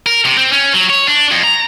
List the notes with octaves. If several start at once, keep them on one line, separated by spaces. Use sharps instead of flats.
A#4
C3
C4
C#4
F#3
C#5
D4
F2
A#5